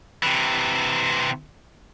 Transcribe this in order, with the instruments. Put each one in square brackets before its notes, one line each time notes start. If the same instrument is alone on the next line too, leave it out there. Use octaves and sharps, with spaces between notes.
[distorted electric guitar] C3 E3